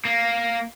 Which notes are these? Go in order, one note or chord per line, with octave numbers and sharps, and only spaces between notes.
A#3